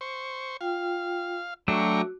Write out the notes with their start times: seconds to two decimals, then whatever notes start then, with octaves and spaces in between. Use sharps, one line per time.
0.01 C5 C#6
0.61 F4 F5 G5
1.68 F#3 A3 D4 F#4 G5 A#5 C#6